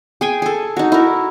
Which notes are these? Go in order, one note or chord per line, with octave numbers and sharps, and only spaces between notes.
G#4 G5 G#5
G#4 A4
D#4 F#4
E4 A#4